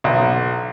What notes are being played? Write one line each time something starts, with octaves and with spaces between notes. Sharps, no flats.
B1